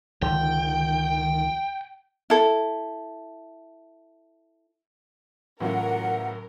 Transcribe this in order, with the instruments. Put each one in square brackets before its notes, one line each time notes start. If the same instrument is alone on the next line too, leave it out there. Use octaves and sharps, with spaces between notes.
[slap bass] C#2 D3 F3 [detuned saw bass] D#3 [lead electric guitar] G5
[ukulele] E4 A4
[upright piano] A2 C#3 [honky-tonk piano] E3 F#3 F4 [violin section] A#4 [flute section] F#5